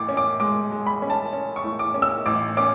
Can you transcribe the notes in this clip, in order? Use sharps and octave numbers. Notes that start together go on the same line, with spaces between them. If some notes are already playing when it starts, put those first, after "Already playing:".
Already playing: A1 A2 D6
C#4
D6
G#3 D6
G#3
B5
C#4
A5
C#4
C#6
A2
D6
C#4
E6
A1 D6
C#4 D6